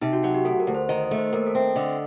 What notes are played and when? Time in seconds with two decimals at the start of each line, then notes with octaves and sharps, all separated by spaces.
0.02 C3 D#4
0.13 F#4
0.23 F#3 F#4
0.34 G4
0.45 D2 A4
0.60 A#4
0.67 D2
0.74 C5
0.89 D#3 D#5
1.04 D#5
1.11 A3
1.18 C5
1.33 D#2 A#4
1.47 A4
1.55 C4
1.76 D3 D#5